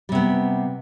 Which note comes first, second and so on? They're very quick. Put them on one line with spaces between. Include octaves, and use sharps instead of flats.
G3 C3 B3